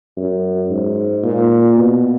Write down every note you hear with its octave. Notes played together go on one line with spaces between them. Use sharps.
F#2
G#2
A#2
B2